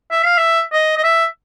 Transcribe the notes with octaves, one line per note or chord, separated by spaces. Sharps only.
E5
F5
E5
D#5
D#5
E5